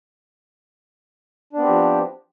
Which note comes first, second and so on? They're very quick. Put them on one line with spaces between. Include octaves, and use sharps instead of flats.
D4 B3 C4 G4 F3